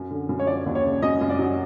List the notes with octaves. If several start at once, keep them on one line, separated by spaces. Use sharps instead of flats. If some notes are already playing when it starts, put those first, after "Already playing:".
Already playing: F#2
D3
F#2
C#5
F3 D5
D#2
C#5
C#3
F#2 D#5
F#2
D5
F#3